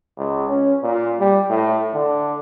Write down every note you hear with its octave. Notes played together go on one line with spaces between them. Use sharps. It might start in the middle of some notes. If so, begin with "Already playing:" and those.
C#2
C#4
A#2
G3
A2
D3